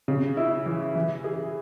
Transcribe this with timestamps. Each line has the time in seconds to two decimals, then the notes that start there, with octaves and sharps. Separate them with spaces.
0.08 C#3
0.37 E4
0.66 E3
0.95 E3
1.24 G#4